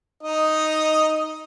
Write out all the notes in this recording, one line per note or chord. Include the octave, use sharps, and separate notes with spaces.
D#4 D#5